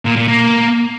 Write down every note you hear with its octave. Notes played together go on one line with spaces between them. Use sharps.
A#2
A#2
A#3